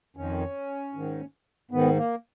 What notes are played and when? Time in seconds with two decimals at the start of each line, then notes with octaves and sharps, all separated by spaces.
0.17 F2 D#3 C#4
0.94 G#2 D#3
1.71 G#2 D#3 B3
1.97 A#3